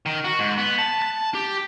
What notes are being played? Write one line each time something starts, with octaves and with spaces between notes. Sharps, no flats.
D#3
F#4
G#2
B3
A5
A5
G4